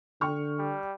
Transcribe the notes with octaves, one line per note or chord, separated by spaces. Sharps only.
D3 G5 C#6 F6
G3